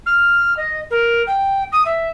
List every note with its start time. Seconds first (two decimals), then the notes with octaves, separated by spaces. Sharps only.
0.06 F6
0.56 D#5
0.90 A#4
1.27 G5
1.72 D#6
1.85 E5